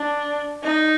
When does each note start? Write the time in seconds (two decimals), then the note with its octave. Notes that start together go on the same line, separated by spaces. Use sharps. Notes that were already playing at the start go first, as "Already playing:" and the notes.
Already playing: D4
0.63 D#4